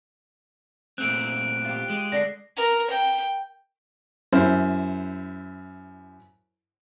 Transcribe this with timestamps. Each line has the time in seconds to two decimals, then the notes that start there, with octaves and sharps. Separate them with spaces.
0.98 A#2 A3 C4 F#6 D7
1.64 F4 G4
1.90 G#3
2.12 D3 D4 A#6 C7
2.56 A#4
2.90 G5
4.33 F#2 E4 C5